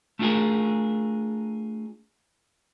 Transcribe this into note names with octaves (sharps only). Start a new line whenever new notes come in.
A3 D4 F4 F#4 G#4 A#4